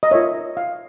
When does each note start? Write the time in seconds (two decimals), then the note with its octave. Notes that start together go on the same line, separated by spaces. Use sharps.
0.03 D#5
0.11 F4 A#4 C#5 E5
0.57 F5